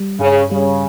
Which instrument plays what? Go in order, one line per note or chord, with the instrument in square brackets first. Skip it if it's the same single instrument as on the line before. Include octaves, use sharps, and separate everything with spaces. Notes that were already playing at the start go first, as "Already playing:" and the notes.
Already playing: [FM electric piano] G3
[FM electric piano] G2 [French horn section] C#3
[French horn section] C#3 [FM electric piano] G3